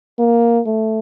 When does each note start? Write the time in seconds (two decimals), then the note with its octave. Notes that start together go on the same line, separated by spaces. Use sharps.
0.19 A#3
0.66 A3